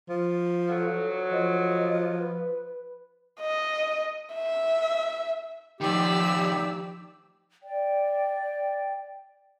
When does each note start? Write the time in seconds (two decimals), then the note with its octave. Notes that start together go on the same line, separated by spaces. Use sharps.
0.09 F3
0.69 D2 F#3 A4
1.31 F3 D#5
2.19 B4
3.40 D#5
4.34 E5
5.81 A2 D#3 F3 G4 D5 E6
7.63 D5 G5